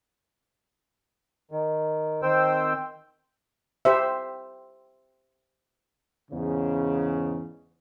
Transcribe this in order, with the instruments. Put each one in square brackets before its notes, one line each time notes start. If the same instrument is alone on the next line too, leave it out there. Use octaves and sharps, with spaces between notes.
[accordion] D#3
D#3 C4 C5 G5 E6
[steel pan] G4 C5 E5
[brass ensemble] E2 G#2 C#3